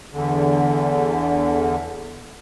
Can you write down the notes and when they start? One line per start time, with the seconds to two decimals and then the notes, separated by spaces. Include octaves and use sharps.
0.13 E2 D3